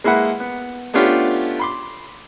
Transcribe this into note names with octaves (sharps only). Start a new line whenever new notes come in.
G#3 A#3 E4 B4 F#5
B3
A3 B3 C#4 D4 F4 G4
B5 C6 D6